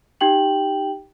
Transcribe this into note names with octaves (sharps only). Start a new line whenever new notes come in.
D#4 G4 G5 F#7